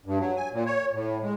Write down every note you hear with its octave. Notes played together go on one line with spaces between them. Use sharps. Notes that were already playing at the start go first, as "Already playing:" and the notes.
G2
F#3
G#5
A#2
C#5
A2
G#3